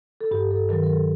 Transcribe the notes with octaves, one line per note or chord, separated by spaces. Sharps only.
A4
G2 G4
A4
D#3 F#3 A#4
A#4
A4